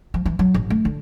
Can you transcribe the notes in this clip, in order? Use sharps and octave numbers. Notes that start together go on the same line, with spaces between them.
F3
E3
F#3
A1
A3
D3